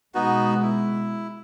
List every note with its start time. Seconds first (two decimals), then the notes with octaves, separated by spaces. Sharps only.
0.15 B2 G#3 B3 D#4 F#4
0.63 E4